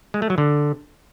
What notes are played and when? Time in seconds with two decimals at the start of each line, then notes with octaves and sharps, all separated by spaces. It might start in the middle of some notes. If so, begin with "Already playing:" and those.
0.14 G#3
0.22 A3
0.30 F#3
0.38 D3